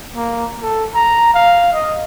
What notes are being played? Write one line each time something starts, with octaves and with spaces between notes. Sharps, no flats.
A#3
A4
A#5
F5
D#5